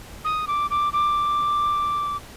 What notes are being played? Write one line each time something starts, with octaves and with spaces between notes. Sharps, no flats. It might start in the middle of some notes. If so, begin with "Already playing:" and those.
D#6
D6
D6
D6